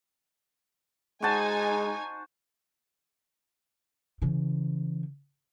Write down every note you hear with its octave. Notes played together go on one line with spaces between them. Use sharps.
G#3 D#4 F#4 C5 G#5 A5
C#3 E3